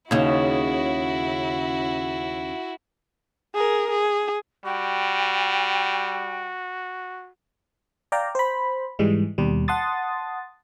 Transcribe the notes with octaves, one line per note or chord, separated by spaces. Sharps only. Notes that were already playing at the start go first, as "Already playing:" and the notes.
D#2 C#3 E4 F#4
G#4 A#4
G#4
G3 F#4 G5
D5 F5 G5 A#5
C5 B5
G#2 E3 G3 G#3
D#2 B2 G3
F#5 A5 C6 D#6 A6